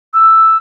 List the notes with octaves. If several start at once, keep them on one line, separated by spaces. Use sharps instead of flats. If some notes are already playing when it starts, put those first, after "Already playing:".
E6